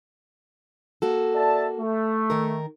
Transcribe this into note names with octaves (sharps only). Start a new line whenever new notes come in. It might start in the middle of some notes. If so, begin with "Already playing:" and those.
A#3 F#4 A4
D5 E5 A5
A3
D#3 A#4